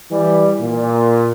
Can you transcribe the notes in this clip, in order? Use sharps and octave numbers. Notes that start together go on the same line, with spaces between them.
E3 G3
A#2